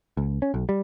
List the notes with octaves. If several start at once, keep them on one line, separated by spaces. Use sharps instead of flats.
C#2
C#4
B1
G3